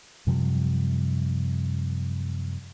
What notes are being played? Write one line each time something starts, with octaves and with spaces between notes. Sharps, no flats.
F#2 C3 F3 G3